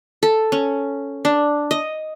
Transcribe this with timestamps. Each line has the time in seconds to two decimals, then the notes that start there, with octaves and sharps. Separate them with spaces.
0.23 A4
0.52 C#4
1.25 D4
1.71 D#5